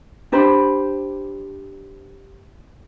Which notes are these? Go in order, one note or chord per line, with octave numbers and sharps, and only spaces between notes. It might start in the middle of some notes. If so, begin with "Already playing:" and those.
D4 G4 C5 B5